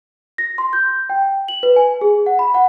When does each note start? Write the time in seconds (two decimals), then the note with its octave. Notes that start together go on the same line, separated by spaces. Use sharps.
0.38 A#6
0.58 C6
0.73 G6
1.10 G5
1.48 F#7
1.63 B4
1.76 G#5
2.01 G#4
2.26 F#5
2.39 B5
2.54 F#5